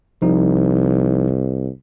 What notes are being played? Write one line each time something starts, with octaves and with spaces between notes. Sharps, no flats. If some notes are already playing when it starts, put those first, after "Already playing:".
C2 F3 D#4